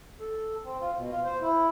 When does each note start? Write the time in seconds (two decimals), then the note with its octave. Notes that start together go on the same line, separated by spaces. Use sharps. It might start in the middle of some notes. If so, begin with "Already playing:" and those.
0.20 A4
0.65 C4
0.81 F4
0.96 B2
1.11 F4
1.24 C5
1.42 E4